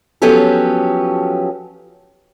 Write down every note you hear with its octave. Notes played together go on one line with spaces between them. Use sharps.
F3 F#3 B3 C#4 G4 A4